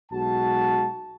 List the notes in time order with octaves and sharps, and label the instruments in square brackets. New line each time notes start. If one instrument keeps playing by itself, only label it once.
[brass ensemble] B1 G#3 F#4 A5